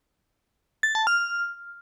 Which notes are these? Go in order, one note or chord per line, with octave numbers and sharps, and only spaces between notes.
A6
A5
F6